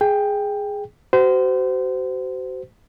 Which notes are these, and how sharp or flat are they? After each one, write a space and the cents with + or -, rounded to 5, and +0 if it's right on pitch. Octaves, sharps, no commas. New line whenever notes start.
G#4 +0 G5 +10
F#4 +35 C5 -30